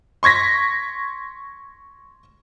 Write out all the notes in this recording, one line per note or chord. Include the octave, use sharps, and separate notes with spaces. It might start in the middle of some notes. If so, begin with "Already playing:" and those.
C6 C#6 G#6 A#6 B6